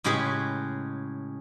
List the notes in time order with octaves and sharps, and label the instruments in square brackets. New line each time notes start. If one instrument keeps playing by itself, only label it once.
[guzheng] A2 C#3 G#3 G4 G#4 B4